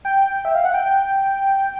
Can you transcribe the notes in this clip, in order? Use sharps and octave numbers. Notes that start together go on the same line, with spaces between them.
G5
E5
F5
F#5
G5